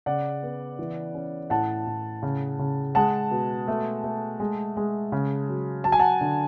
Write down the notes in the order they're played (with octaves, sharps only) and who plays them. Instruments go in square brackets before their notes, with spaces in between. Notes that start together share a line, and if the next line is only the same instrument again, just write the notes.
[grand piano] C#3 D5 F#5
B3
E3
C#4
A2 F#5 A5
A2
C#3
C#3
G#3 F#5 A5
B2
A3
A3
G#3
G#3
C#3
F#3
F#3 A5
G#5
F#5 A5
D3